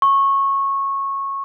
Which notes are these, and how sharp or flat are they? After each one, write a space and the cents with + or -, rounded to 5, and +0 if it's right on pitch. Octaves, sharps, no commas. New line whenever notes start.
C#6 -15